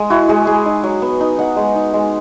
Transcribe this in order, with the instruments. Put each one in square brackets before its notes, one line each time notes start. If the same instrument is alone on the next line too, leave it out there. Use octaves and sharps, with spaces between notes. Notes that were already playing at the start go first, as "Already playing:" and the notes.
Already playing: [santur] G#3
E4 F#4
G#3 G#4
G#3 G#4
D#4
F#3
B3
D#4
D#4 F#5
G#3
D#4
G#3